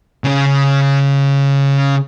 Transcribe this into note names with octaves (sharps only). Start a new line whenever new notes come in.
C#3 C#4